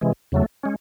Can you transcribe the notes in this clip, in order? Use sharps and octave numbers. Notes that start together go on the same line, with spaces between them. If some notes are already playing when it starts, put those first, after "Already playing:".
C3 E3 G#3
E2 C#3 F#3 A3
G#3 C#4